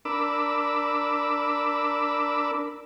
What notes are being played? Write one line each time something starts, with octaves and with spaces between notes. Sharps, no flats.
D4 A#4 B5 D6 E6